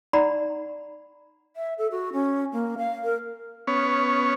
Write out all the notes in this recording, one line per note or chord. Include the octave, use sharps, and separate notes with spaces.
D#4 D5 F#5 A#5 B5
E5
A4
F#4
C#4
A#3
F5
A#4
B3 C#4 C#5